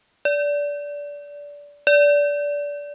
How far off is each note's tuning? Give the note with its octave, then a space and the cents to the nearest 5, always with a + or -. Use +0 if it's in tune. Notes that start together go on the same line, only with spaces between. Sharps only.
D5 -20
D5 -20